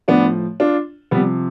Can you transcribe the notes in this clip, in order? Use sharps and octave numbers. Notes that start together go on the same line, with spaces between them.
A2 F3 B3 D4
D4 F4
C3 F3 G3 B3